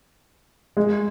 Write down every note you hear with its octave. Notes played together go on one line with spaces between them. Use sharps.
G#3